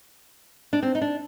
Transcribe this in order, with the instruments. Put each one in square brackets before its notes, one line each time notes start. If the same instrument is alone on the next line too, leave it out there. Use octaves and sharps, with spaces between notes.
[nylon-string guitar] D4
C4
D#4
D4